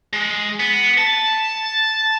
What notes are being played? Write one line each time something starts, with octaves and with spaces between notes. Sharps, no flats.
G#3
B3
A5